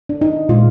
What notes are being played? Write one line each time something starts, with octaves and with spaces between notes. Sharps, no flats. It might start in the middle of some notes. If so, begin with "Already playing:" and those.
D4
D#4
A#2 G#3 F4